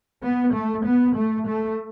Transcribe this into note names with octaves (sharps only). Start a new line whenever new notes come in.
B3
A3
B3
A3
A3